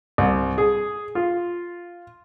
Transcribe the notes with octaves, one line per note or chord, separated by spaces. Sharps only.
C2
G#4
F4